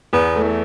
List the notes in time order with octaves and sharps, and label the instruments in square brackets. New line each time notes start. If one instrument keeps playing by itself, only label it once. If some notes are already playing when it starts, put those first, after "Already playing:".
[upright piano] E2 [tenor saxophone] B3
[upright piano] A3
[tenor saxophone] E3